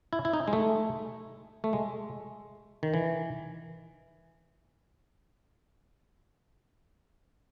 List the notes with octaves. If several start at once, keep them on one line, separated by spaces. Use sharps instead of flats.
E4
E4
D#4
G#3
A3
A3
G#3
D#3
E3